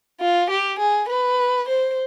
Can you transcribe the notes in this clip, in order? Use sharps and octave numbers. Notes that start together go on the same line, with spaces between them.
F4
G4
G#4
B4
C5